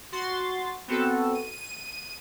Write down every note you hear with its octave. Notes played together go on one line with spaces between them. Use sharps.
F#4 C6 A6
B3 C4 F#4 A4
D#7